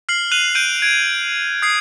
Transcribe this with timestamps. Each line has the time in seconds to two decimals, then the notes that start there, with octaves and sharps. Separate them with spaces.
0.09 F6 C7 F#7
0.32 F#6 D#7 F7 F#7
0.55 F#6 G6 D7 D#7
0.82 G#6 D7
1.62 D#6 G#6 C7